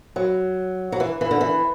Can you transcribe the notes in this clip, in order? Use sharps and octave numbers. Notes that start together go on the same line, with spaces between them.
F#3
F#3
E3
E3
D3
E3